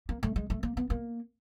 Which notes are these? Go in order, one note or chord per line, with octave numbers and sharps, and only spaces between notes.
A#3
A3
G#3
A3
A#3
B3
A#3